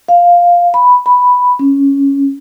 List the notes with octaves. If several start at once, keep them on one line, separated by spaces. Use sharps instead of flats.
F5
B5
B5
C#4